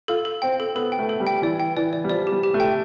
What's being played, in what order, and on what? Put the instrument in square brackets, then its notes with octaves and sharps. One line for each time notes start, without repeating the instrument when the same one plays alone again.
[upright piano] F4 [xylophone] A4
[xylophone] A4
[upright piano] C4 [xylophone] G5
[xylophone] A4
[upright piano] B3 [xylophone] A4
[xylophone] G5
[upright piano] A3
[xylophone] A4
[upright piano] G3
[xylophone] G5
[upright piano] E3 [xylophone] D5
[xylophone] G5
[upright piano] E3 [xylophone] D5
[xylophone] D5
[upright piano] G3
[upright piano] F3 [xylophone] D5
[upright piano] G3 [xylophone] G4
[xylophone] G4
[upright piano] A3
[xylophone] G5